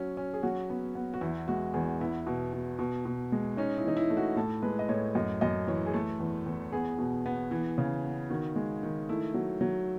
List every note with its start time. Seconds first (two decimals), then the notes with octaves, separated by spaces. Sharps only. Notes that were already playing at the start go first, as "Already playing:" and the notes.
Already playing: F#3 C#4
0.17 C#4
0.34 G#4
0.43 F#3 F#4
0.70 B3
0.95 B3
1.14 F#4
1.21 E2 E4
1.48 G#3 F#4
1.74 E2 G#4
2.01 B3 E4
2.27 B2
2.53 B2
2.79 B2
3.05 B2
3.32 G#3
3.57 C#4 D#4
3.78 E4
3.85 E3 D#4
3.97 E4
4.10 A3
4.17 F#4
4.36 A2 A4
4.62 G#3 B4
4.79 D#5
4.89 A2 C#5
5.15 F#2 D#5
5.41 F#2 D#5
5.67 E3 C#5
5.86 G#4
5.94 A3 A4
6.20 E2
6.46 E2
6.72 B3 G#4
6.98 B2
7.26 B3
7.51 E3
7.78 C#3
8.04 B3
8.30 D#3 F#4
8.56 G#3
8.83 D#3
9.09 A3 E4
9.34 F#3
9.61 F#3